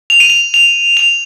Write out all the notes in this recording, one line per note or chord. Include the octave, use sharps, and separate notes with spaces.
F7
D#7
F7
F7
F7